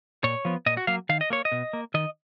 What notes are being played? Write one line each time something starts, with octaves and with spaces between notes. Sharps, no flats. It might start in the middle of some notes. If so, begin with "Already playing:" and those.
A#2 C#5
F3 B3
A#2 D#5
F#4
F#3 A#3 F5
D#3 F5
D#5
A#3 C#5
D#5
B2
A#3
D#3 D#5